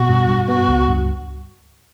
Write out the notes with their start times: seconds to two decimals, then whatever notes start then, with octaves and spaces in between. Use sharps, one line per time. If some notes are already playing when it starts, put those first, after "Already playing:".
Already playing: B2 F#4
0.09 G2
0.29 G2
0.48 B3 F#4
0.68 C#2
0.88 G2